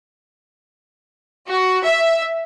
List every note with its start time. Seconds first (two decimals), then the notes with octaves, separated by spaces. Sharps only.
1.49 F#4
1.85 E5